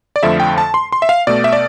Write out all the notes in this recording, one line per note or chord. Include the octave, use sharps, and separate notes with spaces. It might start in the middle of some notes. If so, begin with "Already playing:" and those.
D5
F2 D3 F3 A3 E5
G5
A5
C6
C6
E5
F5
B2 A3 D5
E5
D5